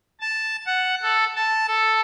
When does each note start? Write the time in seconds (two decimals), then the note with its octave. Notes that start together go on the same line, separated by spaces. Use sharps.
0.20 A5
0.66 F#5
1.02 A4
1.36 A5
1.68 A4